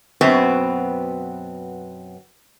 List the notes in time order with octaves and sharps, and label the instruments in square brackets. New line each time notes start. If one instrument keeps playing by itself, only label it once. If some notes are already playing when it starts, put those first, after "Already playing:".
[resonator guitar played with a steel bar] F#2 B2 B3 C4